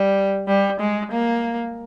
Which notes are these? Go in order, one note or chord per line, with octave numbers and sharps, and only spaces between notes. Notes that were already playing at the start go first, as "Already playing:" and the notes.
Already playing: G3
G3
G#3
A#3